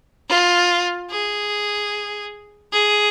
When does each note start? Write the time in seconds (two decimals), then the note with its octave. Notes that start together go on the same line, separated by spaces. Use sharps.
0.29 F4
1.10 G#4
2.73 G#4